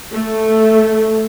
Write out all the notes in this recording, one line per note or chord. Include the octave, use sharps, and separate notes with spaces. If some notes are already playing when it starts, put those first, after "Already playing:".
A3